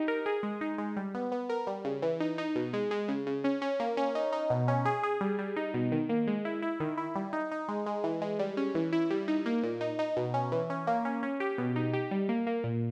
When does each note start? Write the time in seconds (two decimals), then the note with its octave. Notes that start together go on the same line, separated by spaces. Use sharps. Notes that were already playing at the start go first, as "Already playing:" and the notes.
Already playing: D#4 G4
0.08 A#4
0.26 G#4
0.43 G#3
0.61 D#4
0.78 G#3
0.96 G3
1.15 B3
1.32 B3
1.49 A#4
1.67 G3
1.85 C#3
2.02 E3
2.20 D#4
2.38 D#4
2.55 B2
2.73 G#3
2.91 G#3
3.08 C#3
3.27 C#3
3.44 C#4
3.62 C#4
3.80 A#3
3.97 C#4
4.15 D#4
4.32 D#4
4.50 B2
4.68 C#4
4.85 G#4
5.03 G#4
5.21 G3
5.39 G3
5.56 D#4
5.74 B2
5.92 D#3
6.09 A#3
6.28 G#3
6.45 E4
6.62 E4
6.80 D#3
6.98 E4
7.15 G3
7.33 D#4
7.52 D#4
7.68 G#3
7.86 G#3
8.04 E3
8.22 G#3
8.39 G3
8.57 C#4
8.75 E3
8.93 E4
9.10 G3
9.28 D#4
9.46 A#3
9.63 A#2
9.81 D#4
9.99 D#4
10.17 B2
10.34 C#4
10.52 E3
10.70 C#4
10.87 A#3
11.05 C#4
11.23 C#4
11.40 G4
11.58 B2
11.76 D#4
11.93 G4
12.11 G3
12.29 A#3
12.47 A#3
12.64 A#2